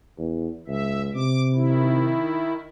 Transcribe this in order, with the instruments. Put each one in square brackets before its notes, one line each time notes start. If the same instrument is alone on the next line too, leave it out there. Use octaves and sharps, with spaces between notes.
[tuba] E2
[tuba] C#2 [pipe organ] E5
[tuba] C3 [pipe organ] D6
[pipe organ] D#3 E4